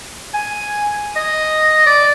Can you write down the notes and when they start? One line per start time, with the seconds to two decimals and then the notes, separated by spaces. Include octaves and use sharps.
0.34 G#5
1.16 D#5
1.86 D5